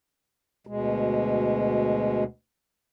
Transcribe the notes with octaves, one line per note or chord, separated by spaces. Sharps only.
D2 B2 G#3